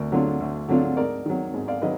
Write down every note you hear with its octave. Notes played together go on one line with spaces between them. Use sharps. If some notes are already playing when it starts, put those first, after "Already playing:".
Already playing: D2 A#4 D5
D3 F#3 D4 F4
D2
D3 F#3 D4 F4
G#2 A#4 D5
D#3 F#3
G#2
D5 F5
D#3 F#3 B4 D#5